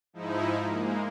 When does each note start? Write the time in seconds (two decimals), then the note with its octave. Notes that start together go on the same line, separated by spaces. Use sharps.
0.13 G#2 F3 D#4 E4
0.67 G#3 A#3